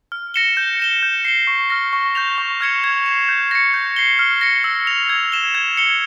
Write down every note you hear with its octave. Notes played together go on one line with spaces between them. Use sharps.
F6
A#6 C#7 E7 G7
G6
C#7 E7 G7
G6
C7 E7 G7
C#6
F6 A#6
C#6
G6 A#6 F7
C#6
F6 G#6 C#7 E7
G#6
C7 E7
G6
A#6 C#7
G6
C7 G7
F6
A#6 C#7
E6
A#6 F7
G#6
E7 G7
G#6
C#7 G7